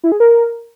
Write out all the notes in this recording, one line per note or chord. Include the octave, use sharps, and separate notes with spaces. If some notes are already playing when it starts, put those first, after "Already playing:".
E4
G#4
A#4